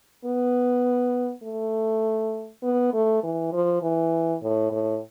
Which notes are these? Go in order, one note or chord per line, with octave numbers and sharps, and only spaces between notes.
B3
A3
B3
A3
E3
F3
E3
A2
A2